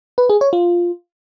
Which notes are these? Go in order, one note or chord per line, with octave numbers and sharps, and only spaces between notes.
B4
G#4
C#5
F4